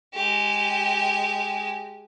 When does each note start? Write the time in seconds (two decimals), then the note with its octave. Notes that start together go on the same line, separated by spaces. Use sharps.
0.14 G#3 G4